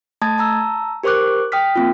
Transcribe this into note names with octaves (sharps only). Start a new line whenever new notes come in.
A3 A5 D#6 G#6 A6
A5 A#5 E6
G4 A#4 C5 C#6 D6 F#6
G5 D#6 F6 B6
A#3 C4 F4